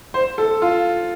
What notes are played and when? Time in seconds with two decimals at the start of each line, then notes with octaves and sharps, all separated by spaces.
0.14 C5
0.38 A4
0.62 F4